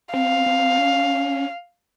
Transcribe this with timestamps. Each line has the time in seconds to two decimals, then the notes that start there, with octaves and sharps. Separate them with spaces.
0.14 C4 F5
0.46 C4
0.78 C#4